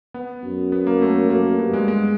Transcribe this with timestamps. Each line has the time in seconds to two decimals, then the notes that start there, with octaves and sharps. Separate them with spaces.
0.14 B3
0.44 F#2
0.72 B3
0.87 A#3
1.02 A3
1.30 F#2 A#3
1.59 G2 B3
1.73 G#3
1.88 G#3